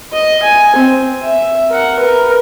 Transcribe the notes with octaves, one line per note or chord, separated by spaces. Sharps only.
D#5
G#5
C4
E5
A#4 F#5
A#4 B4